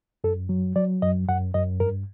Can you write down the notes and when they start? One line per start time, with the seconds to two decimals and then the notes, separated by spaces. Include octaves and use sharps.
0.24 F#2 A4
0.49 F#3
0.76 F#3 D5
1.02 F#2 D#5
1.28 F#2 F#5
1.54 F#2 D#5
1.80 G2 A#4